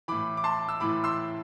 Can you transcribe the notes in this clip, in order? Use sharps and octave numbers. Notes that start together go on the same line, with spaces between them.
A2 E3 B5 D6
D6
A5 C6
E6
A2 E3 B5 D6
C6 E6